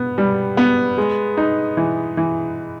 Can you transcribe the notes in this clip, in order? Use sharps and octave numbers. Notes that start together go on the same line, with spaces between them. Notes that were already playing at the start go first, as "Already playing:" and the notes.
Already playing: B3
G3
B3
G#3
D#4
E3
E3